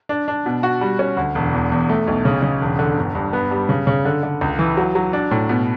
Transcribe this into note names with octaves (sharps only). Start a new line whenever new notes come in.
D4
D4
B2
F#4
G3
C#4
D2
E1
E2
E2
A3
B1
C#3
C#3
E1
D3
G1
G2
B3
G3
C#3
C#3
D3
D3
C#2
E3
F#3
F#3
D4
A2
B2